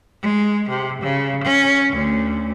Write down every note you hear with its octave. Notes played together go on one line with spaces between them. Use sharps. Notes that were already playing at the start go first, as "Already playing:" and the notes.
G#3
C3
C#3
C#4
D2